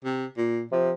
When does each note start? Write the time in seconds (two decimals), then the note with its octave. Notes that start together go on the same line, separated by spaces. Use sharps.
0.05 C3
0.37 A#2
0.72 C3 F3